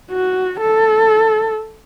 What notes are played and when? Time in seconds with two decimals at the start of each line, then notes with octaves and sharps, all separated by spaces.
0.11 F#4
0.60 A4